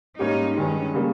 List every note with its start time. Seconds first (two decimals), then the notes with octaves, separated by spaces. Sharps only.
0.19 G#2 G3 A#3 C#4 D#4 G4
0.56 G2 D#3 G#3 C#4
0.94 C#3 G3 A#3